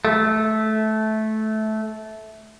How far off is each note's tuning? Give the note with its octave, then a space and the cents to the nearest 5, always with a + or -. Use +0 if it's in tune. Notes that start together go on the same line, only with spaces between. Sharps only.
A3 -15